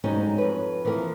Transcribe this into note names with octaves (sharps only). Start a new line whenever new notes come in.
G#2 F#3 G3 C#4 D#4 C5
F2 B4
E3 F3 A#3 A#4